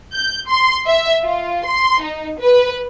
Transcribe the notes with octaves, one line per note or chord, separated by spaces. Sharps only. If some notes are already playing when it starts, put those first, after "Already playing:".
G6
C6
E5
F4
C6
D#4
B4